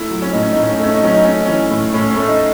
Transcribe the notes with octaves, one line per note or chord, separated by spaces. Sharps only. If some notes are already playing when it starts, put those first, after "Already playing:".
Already playing: A3 E4
F#3
C#4
A2 D#4
C#4
A2 D#4
C#4
D#4
A3 C#4
D#4
F#3 C#4
D#4
A3 C#4
D#4
E3 C#4
A2
A2 C#4
C#4
A3
D#4